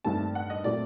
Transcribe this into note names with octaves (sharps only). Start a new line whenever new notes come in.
G2 D#3 A3 C4 A5
F#5
D#5
A#2 F#3 A3 C4 D5